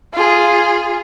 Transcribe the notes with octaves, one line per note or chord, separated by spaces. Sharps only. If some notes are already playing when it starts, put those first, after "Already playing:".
F4 G#4